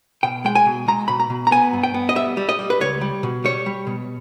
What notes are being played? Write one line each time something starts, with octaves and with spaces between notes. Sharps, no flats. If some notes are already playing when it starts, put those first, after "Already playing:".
B2 G5
G#3 G5
G#5
B2
G#3 A#5
B2 B5
A#5
B2
A#5
B3 G#5
G2
G5
B3
D#5
G3 E5
G3
D#5
G3
B4
C#2 C#5
G3
B2
G3 C#5
G3
B2